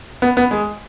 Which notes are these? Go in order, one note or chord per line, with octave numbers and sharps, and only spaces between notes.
B3
B3
G#3